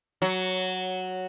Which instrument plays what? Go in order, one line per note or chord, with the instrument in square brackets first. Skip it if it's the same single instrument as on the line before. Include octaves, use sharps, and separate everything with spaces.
[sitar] F#3